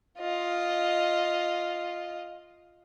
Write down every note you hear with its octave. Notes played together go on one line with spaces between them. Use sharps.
F4 D#5